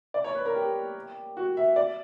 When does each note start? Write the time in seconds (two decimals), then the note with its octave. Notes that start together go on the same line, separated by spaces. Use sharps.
0.14 D5
0.24 C#5
0.35 B4
0.45 A#4
0.55 G4
1.37 F#4
1.57 E5
1.76 D5